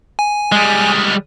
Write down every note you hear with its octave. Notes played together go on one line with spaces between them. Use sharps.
G#5
G3 G#3